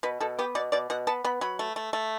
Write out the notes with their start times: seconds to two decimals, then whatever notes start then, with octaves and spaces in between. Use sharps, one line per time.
0.03 B2 B4
0.20 B2 A4
0.39 B3 G4
0.55 B2 D5
0.72 B2 D5
0.90 B2 F#5
1.07 B3 A5
1.24 B3 B5
1.41 F#3 B5
1.59 A3
1.76 A3
1.93 A3